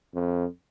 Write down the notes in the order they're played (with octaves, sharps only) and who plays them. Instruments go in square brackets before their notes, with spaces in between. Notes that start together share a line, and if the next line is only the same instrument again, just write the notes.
[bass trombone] F2